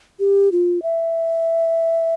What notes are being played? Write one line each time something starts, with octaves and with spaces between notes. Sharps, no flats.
G4
F4
E5